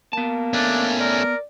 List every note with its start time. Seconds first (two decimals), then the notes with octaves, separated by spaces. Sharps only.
0.13 A#3 B3 A5
0.53 A3 C#4 D4
1.00 A#4 D5